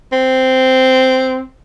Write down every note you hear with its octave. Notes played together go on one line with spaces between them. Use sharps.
C4